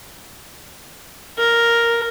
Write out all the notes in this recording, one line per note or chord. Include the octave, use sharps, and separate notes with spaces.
A#4